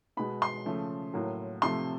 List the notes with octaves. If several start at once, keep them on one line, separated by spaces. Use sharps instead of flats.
B2 G#3 B3 B5
C6
C#3 F3 A3
A2 F#3 A#3
C3 F3 A3 C6